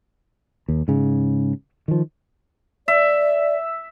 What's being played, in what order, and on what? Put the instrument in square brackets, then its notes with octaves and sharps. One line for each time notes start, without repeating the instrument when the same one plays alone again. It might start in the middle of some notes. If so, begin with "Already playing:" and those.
[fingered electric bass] D#2
G#2 C#3
D#3 F3
[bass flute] D5 [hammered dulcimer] E5